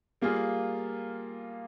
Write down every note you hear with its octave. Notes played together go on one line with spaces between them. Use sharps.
G3 A#3 F4 G#4